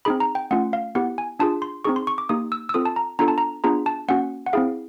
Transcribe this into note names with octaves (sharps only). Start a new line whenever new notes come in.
C4 D#4 G#4 B5
A#5
G5
A3 C#4 F4 F#5
F5
B3 E4 G4 F#5
G#5
D4 F4 G#4 A5
C6
C4 D#4 G#4 C#6
C6
C#6
D6
A#3 D#4 G4 D#6
E6
E6
C4 F4 A4 D#6
A5
A#5
B3 D4 F4 A4 A#5
A5
A#5
B3 D4 F4 G#4 A#5
A5
A#3 C#4 F#4 F#5
F#5
C4 E4 G#4 F5